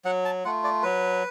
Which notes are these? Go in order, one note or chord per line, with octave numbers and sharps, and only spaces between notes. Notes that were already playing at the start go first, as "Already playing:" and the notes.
F#3 F#5
A5
A3 F4 F#5
D5
F#3 B4